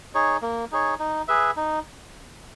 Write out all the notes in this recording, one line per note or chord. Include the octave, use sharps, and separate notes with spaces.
D#4 G#4 C#5
A#3
D#4 G#4 C#5
D#4
G#4 B4 E5
D#4